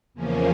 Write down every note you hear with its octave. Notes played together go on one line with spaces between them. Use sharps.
E2 C#3 F3 A#3 C#4